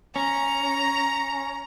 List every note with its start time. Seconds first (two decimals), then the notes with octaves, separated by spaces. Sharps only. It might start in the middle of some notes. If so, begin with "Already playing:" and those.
0.16 C#4 A#5